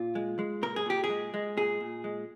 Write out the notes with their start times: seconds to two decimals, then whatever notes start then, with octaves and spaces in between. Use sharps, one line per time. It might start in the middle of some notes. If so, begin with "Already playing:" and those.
Already playing: A#2 F4
0.15 G#3
0.39 G#3
0.62 A#2 A#4
0.76 G#4
0.86 A#2 G4
1.04 G#4
1.10 G#3
1.34 G#3
1.57 A#2 G#4
1.80 A#2
2.04 G#3